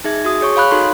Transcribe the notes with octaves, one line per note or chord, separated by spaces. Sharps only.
D#4 G#4 E5 G#6
F#4 D#6
G#4 C#5 C#6
C#5 F5 B5 F#6
D#4 F#4 A4 B5 C6